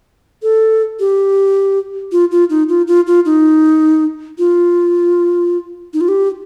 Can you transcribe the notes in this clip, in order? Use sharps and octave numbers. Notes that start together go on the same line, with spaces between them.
A4
G4
F4
F4
D#4
F4
F4
F4
D#4
F4
D#4
F4
G4